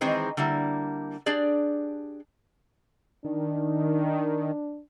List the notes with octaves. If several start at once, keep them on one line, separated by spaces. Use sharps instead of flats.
D#3 E3 G#3 C4 D#4 G#4
D3 G3 A#3 E4
D4 G4 G#4 D5
D#3 D4